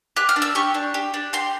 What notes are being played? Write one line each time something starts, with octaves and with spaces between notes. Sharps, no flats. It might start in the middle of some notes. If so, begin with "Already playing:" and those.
G4 F#6
F6
D4
E6
G4 C#6
D4
G4
D4
G4 C6